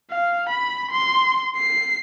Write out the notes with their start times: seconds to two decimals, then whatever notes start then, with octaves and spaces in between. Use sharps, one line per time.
0.11 F5
0.49 B5
0.91 C6
1.56 C7